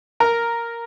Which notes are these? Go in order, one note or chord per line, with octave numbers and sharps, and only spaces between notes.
A#4